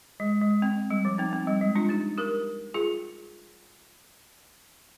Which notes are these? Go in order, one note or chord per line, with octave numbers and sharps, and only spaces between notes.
G#3
G#3
C4
G3
F3
C4 D#4
C4
G3
G#3
D4 F4
D#4 G4
G4 A#4
F4 G#4